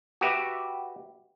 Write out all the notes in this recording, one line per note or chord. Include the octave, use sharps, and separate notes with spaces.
F#4 G4 B4 E5